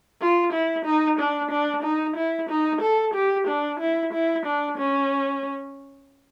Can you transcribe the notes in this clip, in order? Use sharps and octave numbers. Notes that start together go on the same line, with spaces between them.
F4
E4
D#4
D4
D4
D#4
E4
D#4
A4
G4
D4
E4
E4
D4
C#4